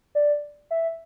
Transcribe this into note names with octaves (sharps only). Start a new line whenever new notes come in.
D5
E5